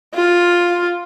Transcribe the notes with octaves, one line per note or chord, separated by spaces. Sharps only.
F4